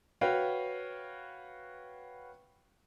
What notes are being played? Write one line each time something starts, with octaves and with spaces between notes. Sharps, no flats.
F#4 B4 C#5 F5 G5